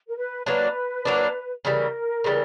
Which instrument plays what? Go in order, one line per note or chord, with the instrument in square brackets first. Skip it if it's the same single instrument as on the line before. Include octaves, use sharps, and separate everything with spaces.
[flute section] A#4
B4
[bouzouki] F#3 A#3 D4 [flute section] B4
[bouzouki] F#3 A#3 D4
[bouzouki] C#3 E3 G3 [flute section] A#4
[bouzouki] C#3 E3 G3